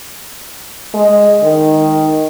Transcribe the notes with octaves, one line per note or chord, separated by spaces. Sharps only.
G#3
D#3